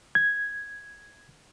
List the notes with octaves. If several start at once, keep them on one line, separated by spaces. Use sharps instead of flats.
G#6